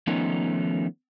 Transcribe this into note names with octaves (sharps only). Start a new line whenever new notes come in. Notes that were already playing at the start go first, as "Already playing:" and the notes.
D#3 F3 A3 B3 C#4 D#4